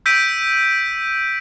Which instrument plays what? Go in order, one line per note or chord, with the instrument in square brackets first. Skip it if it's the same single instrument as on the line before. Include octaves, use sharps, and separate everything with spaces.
[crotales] E6 G6 B6 D7 D#7